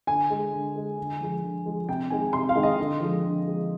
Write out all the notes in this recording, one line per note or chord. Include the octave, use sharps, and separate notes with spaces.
D3 G#5
G#3
D3
G#3
D3
F3 G#3
D3
F3 G#3
C3 G5
D#3 G#3 G#5
C3 C6
F5
D#3 G#3
D#5
D3
F3 G#3
D3
F3 G#3